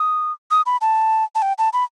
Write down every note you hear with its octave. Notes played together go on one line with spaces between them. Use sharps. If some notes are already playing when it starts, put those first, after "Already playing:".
Already playing: D#6
D#6
B5
A5
A5
G5
A5
B5